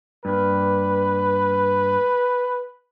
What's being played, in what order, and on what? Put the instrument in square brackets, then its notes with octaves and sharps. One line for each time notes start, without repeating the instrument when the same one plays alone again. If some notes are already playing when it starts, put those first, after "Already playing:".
[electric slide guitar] G2 A#3 [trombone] B4